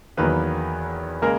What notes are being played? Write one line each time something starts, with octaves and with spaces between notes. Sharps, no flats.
E2 D#3 F#3 A#3 B3 B4
C#3 G#3 A#3 A#4